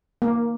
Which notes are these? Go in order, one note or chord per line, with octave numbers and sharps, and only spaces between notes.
A#3